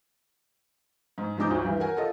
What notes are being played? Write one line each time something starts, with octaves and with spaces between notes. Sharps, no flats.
G#2
G#2 F3 G#3 D#4 D6 G6
D2
G2 E3
A#4 F#5 G#5
F4 A4 D#5